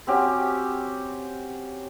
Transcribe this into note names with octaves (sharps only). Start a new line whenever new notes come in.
C4 C#4 F#4 G4